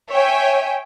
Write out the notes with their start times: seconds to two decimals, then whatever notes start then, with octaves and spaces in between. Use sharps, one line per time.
0.10 C#5 E5 G5 G#5